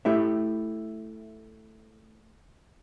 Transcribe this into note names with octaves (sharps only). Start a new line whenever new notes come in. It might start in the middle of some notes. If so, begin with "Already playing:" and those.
A3 E4 G4 E5